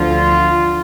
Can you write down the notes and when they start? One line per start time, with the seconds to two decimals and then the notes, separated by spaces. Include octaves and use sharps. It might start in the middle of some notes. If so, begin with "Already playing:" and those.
Already playing: D2 D3 F3 F4